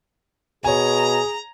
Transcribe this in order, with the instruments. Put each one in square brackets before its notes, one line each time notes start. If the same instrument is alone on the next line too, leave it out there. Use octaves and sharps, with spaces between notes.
[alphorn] B2 [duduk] G#4 [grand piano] C#5 G#5 [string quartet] A#5